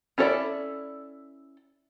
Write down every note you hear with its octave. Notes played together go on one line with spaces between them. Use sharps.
C#4 E4 A4 C#5 D5